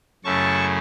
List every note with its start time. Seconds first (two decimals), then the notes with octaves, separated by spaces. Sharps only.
0.24 F#2 C#3 A3 E4 A5 C#6